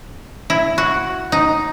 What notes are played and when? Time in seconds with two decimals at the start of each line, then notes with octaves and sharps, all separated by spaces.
0.50 E4
0.78 F#4
1.32 D#4